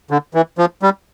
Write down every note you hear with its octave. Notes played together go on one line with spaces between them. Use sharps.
D3
E3
F3
G3